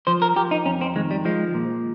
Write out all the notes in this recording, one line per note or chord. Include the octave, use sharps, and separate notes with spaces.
F3 C5
A#4
F3 G4
D#4
F2 C#4
C4
D#3 G#3
G3
F3 G#3
A#2